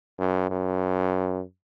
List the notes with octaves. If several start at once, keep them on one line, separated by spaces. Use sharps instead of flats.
F#2
F#2